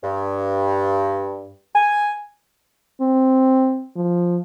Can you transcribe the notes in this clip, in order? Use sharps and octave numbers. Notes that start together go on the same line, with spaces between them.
G2
G#5
C4
F3